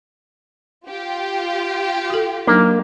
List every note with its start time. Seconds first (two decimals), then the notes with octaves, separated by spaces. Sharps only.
0.87 F4 G4
2.10 F#4 A4
2.47 F#3 A#3 D4 D#4